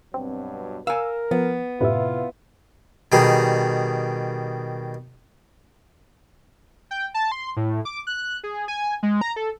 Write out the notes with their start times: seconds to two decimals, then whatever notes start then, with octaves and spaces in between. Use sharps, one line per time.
0.14 G2 B2 F#3 C4
0.87 A#4 F5 G#5 E6
1.31 F3 B3
1.81 F#2 A2 C3 E4 F4 B4 E5
3.12 B2 D#3 G3 G#4
6.91 G5
7.14 A5
7.31 C6
7.57 A2
7.85 D6
8.07 F#6
8.44 G#4
8.68 G#5
9.03 G#3
9.21 A#5
9.36 A4